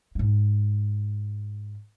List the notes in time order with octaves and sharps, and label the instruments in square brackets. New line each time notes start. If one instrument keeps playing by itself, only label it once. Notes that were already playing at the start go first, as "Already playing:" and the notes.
[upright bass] G#2 G#3